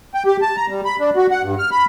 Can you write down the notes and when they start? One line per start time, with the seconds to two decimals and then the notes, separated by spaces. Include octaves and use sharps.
0.14 G5
0.26 G4
0.42 A5
0.57 A#5
0.70 G3
0.85 B5
1.00 D4
1.16 F#4
1.31 F#5
1.43 G2
1.59 F6
1.71 B5